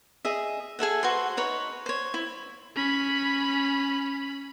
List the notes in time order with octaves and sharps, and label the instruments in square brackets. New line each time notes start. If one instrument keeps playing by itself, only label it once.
[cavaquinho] G#4 D#5 E5
G#4 A4 E5 F#5
F#4 B4 C5 C6
D#4 B4 C#5
C5 C#5
E4
[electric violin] C#4 B5